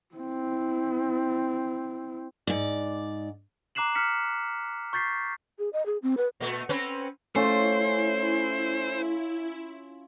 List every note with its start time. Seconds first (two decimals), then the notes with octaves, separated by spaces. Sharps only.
0.15 C4 E4
2.47 G#2 D5
3.75 A#5 D6 F#6 C7 E7 F#7
3.95 F6 B6 C#7
4.93 C#6 G6 A6 B6 C7
5.59 G#4
5.73 D#5
5.86 G#4
6.02 C4
6.17 B4
6.40 A#2 A3
6.69 C4 C#4 B4
7.36 A3 C#4 E4 F4 C5